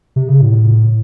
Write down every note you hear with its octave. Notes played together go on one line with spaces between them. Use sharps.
C3
C#3
A2